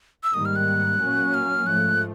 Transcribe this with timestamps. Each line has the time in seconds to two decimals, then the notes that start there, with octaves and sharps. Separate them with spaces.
0.24 E6
0.34 G#2 D#3 G3 A#3 D#6
0.45 F6
0.56 F#6
1.00 A#2 F#3 A#3 C#4
1.34 F6
1.67 G#2 F3 A3 F#6